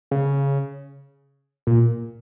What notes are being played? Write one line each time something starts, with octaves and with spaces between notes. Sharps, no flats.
C#3
A#2